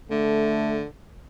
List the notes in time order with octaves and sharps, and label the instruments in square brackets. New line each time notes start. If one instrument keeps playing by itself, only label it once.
[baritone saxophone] D3 [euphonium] A3